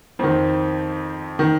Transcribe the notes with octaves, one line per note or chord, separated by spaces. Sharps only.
F2 D#3 C4
D#3